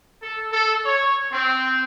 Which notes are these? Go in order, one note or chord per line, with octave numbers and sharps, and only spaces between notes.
A4
A4
C#5
C4